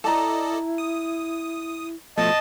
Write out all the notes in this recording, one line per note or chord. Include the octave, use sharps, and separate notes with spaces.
E4 A4 D5 D#5 A5 A#5
D#6
B2 F3 A3 D#5 A5